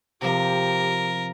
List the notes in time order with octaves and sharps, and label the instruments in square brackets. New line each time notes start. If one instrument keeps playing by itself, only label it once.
[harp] C3 F3 [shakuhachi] G4 [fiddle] A#4